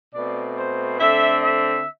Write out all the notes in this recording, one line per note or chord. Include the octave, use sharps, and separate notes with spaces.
B2 A3 C4 D5
C5
D3 A3 C4 E5
E5